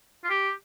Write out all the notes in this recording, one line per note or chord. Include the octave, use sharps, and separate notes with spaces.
F4
G4